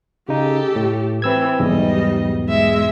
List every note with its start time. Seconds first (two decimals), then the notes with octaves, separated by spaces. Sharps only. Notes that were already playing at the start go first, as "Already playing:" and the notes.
0.29 C#3 D#4 G4 A4
0.76 A2
1.22 E3 C4 B4 E6 G#6
1.59 B1 E2 G#2 G3 D#5
2.48 G#3 E5